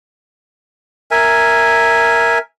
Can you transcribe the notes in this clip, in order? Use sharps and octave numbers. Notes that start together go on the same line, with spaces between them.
A#4 E5 G#5